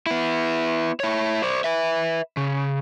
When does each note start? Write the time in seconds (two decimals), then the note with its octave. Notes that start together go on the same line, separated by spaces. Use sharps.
0.06 B3 E4
1.00 E4 C#5
1.43 C5 D5
1.64 B4 E5
2.37 C#3